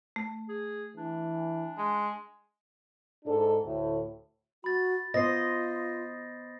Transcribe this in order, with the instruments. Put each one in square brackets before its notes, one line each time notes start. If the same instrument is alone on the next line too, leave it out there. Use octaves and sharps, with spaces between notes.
[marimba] A3
[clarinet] G#4
[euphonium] E3 [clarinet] D4
[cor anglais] G#3
[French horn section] G#2 D4 A4
D2 A2
[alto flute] F#4 [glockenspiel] B5 A6
[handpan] B3 C5 D#5 [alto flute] F4 [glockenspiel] A#6 C7